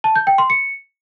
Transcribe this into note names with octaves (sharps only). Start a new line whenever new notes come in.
A5
G6
G5
C6
C#7